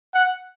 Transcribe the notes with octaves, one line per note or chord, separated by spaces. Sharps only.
F#5